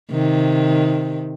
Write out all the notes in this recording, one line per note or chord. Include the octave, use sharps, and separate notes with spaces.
C3 D#3